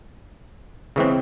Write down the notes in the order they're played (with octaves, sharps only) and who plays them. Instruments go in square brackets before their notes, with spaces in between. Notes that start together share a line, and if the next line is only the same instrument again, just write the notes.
[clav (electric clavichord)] C#3 E3 G#3 C4